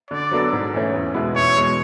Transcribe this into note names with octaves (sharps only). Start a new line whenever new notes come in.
D3 D5
F#3 B3 D4 A4
G#2
E3 A3 C#4
E2
B2 G#3 B3 E4
E2 C#5
B2 G#3